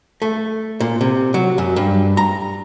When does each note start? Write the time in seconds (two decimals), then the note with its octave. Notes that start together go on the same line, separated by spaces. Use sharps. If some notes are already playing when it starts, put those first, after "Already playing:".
0.22 A3
0.80 A#2
1.01 C3
1.34 F#3
1.58 F#2
1.76 G2
2.17 A#5